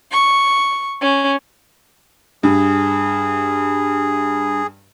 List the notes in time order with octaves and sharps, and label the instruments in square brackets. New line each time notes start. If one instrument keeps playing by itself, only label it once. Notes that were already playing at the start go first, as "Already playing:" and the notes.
[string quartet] C#6
C#4
[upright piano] G2 [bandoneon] G#4